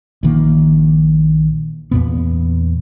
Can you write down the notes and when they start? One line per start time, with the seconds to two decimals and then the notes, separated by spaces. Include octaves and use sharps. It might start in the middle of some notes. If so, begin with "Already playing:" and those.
0.23 A#1 D#3 A#3
1.91 E2 A#2 B3